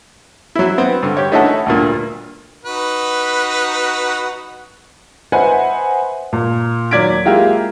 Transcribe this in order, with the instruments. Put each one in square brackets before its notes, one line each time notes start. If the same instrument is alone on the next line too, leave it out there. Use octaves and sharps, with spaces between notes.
[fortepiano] F#3 E4
B3 C4
G2 D3
G4 C#5
A3 C#4 D#4 E4 F#4 A4
D2 G2 A#2
[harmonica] D#4 F#4 B4
[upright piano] B4 C5 D#5 E5 F#5 G#5
A#2
D#2 F#3 D5 G#6 B6 D7
G#3 A#3 E4 F4 G4